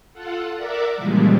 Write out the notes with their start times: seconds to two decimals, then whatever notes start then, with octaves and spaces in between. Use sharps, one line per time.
0.14 F4 A4 F#5
0.55 A#4 D5 E5 F#5 D6
0.97 A#2 C#3 E3 F3 G3 G#3